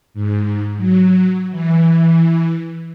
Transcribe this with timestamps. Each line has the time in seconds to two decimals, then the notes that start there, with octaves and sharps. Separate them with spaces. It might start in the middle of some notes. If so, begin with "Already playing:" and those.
0.14 G#2
0.77 F#3
1.51 E3